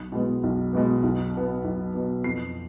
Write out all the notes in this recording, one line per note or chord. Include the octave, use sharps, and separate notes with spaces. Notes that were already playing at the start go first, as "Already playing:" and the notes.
Already playing: B1
B2 G#3 B3
B1
B2 G#3 B3
B1
B2 B3
B1
B2 B3
F2 C7